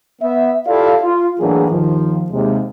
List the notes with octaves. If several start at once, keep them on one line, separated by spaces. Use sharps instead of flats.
B3 E5
E4 F4 G4 A4 D5 F5
F4
A2 E3 F#3 A#3 D4 G#4
D#2 D#3 F3
D#2 C3 G#3